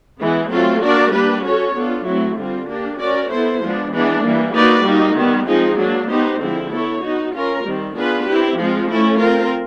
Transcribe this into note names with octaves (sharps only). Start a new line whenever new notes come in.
E3 G#3 B3
F#3 A3 C4 F4 A4
A#3 D4 F#4 A#4 D5
G3 A#3 D4 G4 B4
C#4 F#4 A4 C#5
B3 D4 F4 A4
F#3 A3 C4 E4
D3 G3 C4 F4
A#3 D4 G4
C#4 F#4 A#4 D5
B3 E4 A4 C5
F3 G#3 B3 D4
E3 G#3 B3 D4
E3 G3 A#3
A#3 D#4 F#4 B4 D5
G3 A#3 D#4 F#4
D#3 G3 B3
F3 G#3 C4 D#4 G#4
F#3 A#3 D4
B3 D#4 G4 C5
D3 F3 G#3 C4 E4
B3 E4 A4 C#5
B3 D#4 F#4
C#4 F4 A#4
D#3 G3 C4
B3 D4 F4 G#4 B4
C4 E4 G4
F3 G#3 C4 F4
A3 C#4 E4 A4
C4 F4 A#4